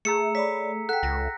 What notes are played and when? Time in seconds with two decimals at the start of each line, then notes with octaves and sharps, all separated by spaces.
0.05 A3 G#4 A#5 E6 C#7
0.35 C#5 D5 B5 B6
0.89 A4 F#5 G5 F#6 B6
1.03 C#2 A#6